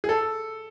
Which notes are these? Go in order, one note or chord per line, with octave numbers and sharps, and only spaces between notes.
G#4
A4